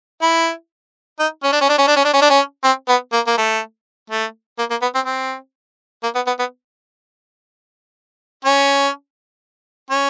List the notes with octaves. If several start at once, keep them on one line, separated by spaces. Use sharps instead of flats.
E4
D#4
C#4
D4
C#4
D4
C#4
D4
C#4
D4
C#4
D4
C#4
C4
B3
A#3
A#3
A3
A3
A#3
A#3
B3
C4
C4
A#3
B3
B3
B3
C#4
C#4